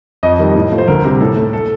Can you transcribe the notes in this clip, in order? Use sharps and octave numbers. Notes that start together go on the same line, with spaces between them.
F2 D#5
D#3 G3
A2
F3 A3
C5
D2 A#4
C3 G3
A2 A4
A3
A4